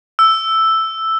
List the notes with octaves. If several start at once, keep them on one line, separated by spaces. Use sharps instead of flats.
E6